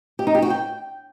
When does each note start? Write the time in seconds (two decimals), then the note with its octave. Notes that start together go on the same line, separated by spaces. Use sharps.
0.19 G4
0.27 D#4
0.35 G4
0.42 F#4
0.50 G5